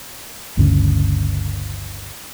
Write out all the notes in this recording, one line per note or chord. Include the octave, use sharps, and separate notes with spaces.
G1 D2 G2 C#3